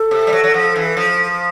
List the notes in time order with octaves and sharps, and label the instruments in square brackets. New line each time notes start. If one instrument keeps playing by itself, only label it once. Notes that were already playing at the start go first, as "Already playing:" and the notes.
Already playing: [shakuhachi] A4
[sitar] C3
G3
F#3
F#3
F3
E3
F3